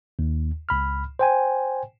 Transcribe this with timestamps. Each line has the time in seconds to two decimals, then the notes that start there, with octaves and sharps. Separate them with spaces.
0.19 D#2
0.69 C#2 B5 F6
1.19 C5 G5 G#5